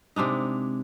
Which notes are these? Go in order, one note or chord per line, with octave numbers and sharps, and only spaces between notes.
C3 G#3 D4 D#4